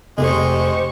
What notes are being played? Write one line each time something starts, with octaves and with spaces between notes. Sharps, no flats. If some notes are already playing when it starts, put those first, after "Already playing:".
F1 G#3 G4 C5 C#6